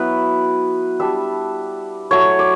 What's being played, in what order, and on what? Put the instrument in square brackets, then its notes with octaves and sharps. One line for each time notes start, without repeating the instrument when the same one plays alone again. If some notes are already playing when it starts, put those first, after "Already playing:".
Already playing: [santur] F#3 B3 E4 B4
G3 D4 E5
F#3 A3 E4 C#5
D5